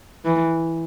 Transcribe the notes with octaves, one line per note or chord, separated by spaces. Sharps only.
E3